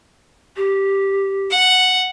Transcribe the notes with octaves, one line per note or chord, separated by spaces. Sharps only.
G4
F#5